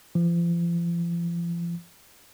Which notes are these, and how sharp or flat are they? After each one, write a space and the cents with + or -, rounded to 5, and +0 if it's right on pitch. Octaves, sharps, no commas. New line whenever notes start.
F3 -40